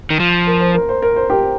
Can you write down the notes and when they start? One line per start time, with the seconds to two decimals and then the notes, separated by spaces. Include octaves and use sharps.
0.10 D#3
0.20 F3
0.47 A#4
0.60 C5
0.74 A#4
0.89 C5
1.02 A#4
1.16 C5
1.30 G4 A#4